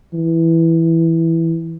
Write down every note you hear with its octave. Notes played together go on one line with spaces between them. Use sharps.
E3